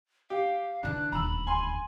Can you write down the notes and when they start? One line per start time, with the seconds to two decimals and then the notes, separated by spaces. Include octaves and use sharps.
0.30 G4 F5
0.83 D3 E3 D4 F#6
1.12 D#1 D2 A#5 B5 E6
1.47 G#5 C6